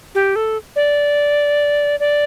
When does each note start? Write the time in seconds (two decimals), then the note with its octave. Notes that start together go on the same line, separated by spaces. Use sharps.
0.15 G4
0.36 A4
0.76 D5
2.00 D5